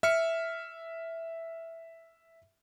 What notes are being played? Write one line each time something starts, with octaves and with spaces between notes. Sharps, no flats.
E5 F6 C#7